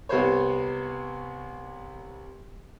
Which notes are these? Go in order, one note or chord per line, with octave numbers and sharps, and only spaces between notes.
C2 C3 B3 C5 C#5